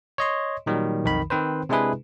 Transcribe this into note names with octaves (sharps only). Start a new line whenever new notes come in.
C#5 D#5 C6
A#2 D#3 F#3 G3
B1 F2 D#3 B5
D#3 C4 B4 C5
C3 G#3 D4 E4 G#4 B4